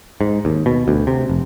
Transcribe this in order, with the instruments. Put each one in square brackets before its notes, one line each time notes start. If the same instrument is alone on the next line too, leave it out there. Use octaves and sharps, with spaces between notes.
[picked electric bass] G#2
D#2
B2
D2
C3
F1